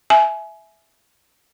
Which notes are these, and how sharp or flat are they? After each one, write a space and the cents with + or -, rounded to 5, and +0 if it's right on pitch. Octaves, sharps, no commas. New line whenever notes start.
E5 +0 G#5 +25